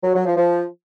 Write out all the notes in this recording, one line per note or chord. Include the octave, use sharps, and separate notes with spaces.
F#3
F#3
F3
F3